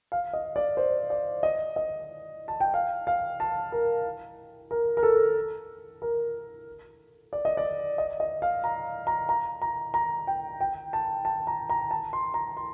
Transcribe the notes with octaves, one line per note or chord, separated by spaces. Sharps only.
F5
D#5
D5
C5
D5
D#5
D#5
A5
G5
F5
F5
A5
A#4
A#4
A#4
A4
A#4
D5
D#5
D5
D#5
D#5
F5
A#5
A#5
A#5
A#5
A#5
G5
G5
A5
A5
A#5
A#5
A5
C6
A#5
C6